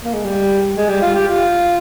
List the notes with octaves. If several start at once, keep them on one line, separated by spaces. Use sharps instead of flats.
A#3
G#3
G3
G#3
G3
F4
G4
F4